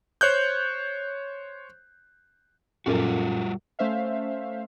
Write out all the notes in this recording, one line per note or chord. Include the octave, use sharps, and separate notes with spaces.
C5 C#5 F#6 G6
F#2 A#2 G3 F4 F#4 A4
A3 C#4 C5 E5 F5